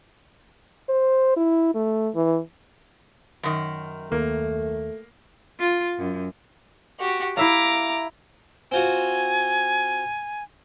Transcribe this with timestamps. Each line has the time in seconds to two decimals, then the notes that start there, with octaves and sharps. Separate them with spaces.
0.89 C5
1.37 E4
1.74 A3
2.15 E3
3.43 F#2 D#3
4.12 D#2 A3 A#3
5.59 F4
5.98 F#2
6.99 F#4 G4
7.37 E4 E5 F5 A#5 D6
8.71 C4 F4 F#4 G#5